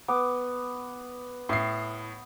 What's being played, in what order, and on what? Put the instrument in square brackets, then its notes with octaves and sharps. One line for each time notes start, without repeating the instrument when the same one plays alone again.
[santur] B3 D6
[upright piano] A2 C7 [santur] D#6